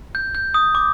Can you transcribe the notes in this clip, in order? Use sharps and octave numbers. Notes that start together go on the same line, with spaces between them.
G6
G6
D#6
D6